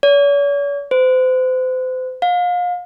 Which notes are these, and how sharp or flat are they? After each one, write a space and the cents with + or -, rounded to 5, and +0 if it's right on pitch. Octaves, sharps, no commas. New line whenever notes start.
C#5 +45
C5 -35
F5 +35